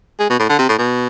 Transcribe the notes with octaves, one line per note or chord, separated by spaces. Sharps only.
G#3
B2
A2
D3
C3
A2
B2